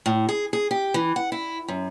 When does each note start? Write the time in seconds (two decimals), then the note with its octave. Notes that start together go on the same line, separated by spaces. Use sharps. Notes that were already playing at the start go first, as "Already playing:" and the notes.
0.06 A2
0.29 G#4
0.53 G#4
0.71 G4
0.94 E3
1.16 F#5
1.32 E4
1.68 F#2